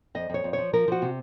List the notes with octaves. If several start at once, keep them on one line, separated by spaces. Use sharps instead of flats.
F2 D#5
F2 C#5
F2
F3 C#5
F3 A#4
F3 F#4
C3